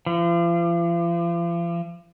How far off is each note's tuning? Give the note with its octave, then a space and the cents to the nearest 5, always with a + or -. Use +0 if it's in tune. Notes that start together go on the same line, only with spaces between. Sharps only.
F3 -40